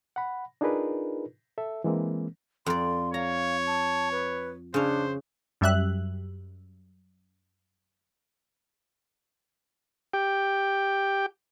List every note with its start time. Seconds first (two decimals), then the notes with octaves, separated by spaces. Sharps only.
0.16 F#5 B5
0.61 D4 D#4 F4 G#4 A#4 B4
1.58 A4 E5
1.84 E3 G#3 A#3 C4
2.66 F2 D5 C6
3.14 C#5 F5 A#5
3.66 A5
4.12 B4
4.74 C#3 D4 C5 C#5
5.61 F#2 G3 E5 F#6
10.13 G4 G5